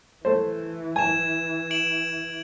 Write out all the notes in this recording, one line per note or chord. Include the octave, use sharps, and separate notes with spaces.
E3 A3 C5
G#5 G#6 E7
D7 E7 F#7